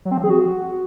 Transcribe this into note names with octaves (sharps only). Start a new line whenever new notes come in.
F#3
C4
F3
G#4
F#4